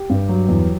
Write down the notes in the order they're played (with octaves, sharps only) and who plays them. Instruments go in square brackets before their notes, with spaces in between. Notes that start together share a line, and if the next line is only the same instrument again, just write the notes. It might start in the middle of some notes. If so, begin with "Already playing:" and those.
Already playing: [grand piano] G4
G2
F#3
E2